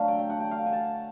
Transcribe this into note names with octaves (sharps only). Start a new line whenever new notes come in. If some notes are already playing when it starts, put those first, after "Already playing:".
Already playing: D3 F#3 A3 F5
G5
G5
F#5
G5
F5
G#5
A5